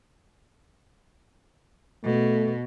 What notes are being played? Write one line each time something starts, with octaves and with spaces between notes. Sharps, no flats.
B2 A3